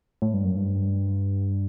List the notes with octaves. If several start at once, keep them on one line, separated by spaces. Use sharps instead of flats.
A2
G2
F#2
G2